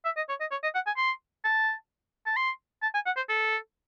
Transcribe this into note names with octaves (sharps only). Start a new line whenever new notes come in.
E5
D#5
C#5
D#5
C#5
D#5
F#5
G#5
C6
A5
A5
C6
A5
G#5
F#5
C5
A4